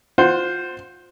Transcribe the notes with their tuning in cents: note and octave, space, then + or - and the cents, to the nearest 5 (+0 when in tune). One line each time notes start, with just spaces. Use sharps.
F4 +30 C5 +0 F#5 +15